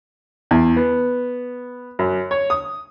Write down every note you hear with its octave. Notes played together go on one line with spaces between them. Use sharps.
E2
B3
F#2
C#5
D#6